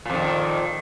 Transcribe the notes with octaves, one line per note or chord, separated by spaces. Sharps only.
F2 A#2 D#3